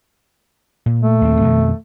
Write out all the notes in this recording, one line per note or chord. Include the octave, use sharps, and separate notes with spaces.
A#2
A3
D#2 A#2 C4
F2 B2 D#3